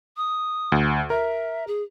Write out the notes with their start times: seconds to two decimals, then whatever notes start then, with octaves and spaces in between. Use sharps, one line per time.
0.17 D#6
0.72 D2
1.10 A#4 E5
1.67 G#4